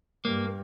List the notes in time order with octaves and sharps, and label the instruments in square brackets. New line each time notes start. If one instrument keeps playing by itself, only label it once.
[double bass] G2 [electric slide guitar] A#3